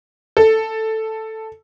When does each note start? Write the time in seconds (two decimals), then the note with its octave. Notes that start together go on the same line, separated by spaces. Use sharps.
0.37 A4